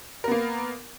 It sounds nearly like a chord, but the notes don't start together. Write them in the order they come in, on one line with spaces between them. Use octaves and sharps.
A#4 B3 A#3